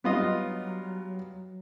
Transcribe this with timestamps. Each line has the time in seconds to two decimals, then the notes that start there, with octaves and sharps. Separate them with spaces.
0.04 G2 F#3 G3 B3 F4 D#5